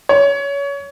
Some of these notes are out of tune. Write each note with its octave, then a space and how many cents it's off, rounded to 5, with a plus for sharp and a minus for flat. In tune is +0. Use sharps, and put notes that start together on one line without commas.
C#5 +25